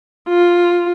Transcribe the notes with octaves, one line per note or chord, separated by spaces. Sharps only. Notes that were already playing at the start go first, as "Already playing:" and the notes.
F4